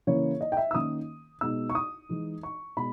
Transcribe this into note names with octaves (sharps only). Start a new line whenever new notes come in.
C#3 E3 A#3 E4 C#5
D#5
G5
E5
E6
D#3 A#3 C#4 D#6
B2 G#3 D#4 E6
C#6
D#6
E3 G#3 D#4
C#6
B2 G#3 B5